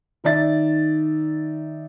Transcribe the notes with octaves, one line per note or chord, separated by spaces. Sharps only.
D#3 D#4 D5 E5 A6